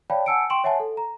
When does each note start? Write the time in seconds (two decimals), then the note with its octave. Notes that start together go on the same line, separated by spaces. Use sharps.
0.10 C#5 D5 F5 G5 A5 B5
0.26 F#5 G#5 A5 E6 C#7 D7
0.50 G5 C6 C#6 D7 E7 F#7
0.64 C#5 E5 F#5 G#5 A5
0.80 A4
0.97 A#5